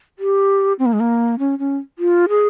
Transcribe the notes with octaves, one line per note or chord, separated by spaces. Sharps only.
G4
C4
A#3
G#3
A#3
C#4
C#4
F4
G#4